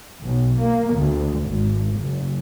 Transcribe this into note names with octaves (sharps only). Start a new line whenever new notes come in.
B1
A#3
D2
G#1
F#1